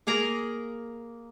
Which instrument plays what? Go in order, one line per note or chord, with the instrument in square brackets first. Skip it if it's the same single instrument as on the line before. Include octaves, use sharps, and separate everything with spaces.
[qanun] A#3 G#4 A#4 A#5